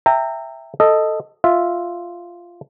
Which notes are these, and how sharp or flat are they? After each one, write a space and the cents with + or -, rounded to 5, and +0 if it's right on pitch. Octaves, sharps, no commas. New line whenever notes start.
E5 +5 G5 +15 A#5 -25
A4 +5 D#5 +0
F4 +0 E5 +0